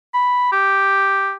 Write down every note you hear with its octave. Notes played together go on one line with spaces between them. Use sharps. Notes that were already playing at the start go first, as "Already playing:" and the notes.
B5
G4